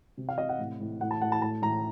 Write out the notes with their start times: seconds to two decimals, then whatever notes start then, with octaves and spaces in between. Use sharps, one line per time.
0.17 C3
0.29 F5
0.38 C3 D#5
0.49 F#5
0.59 A2
0.80 A2
1.01 A2 F#5
1.11 A5
1.21 A2 F#5
1.32 A5
1.42 A2 A5
1.62 A2 A#5